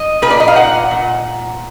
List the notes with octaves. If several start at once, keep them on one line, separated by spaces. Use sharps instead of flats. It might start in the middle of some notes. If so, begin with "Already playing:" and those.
Already playing: D#5
A#2 B4
D5
D#5
F5
D#4 F#5
A#2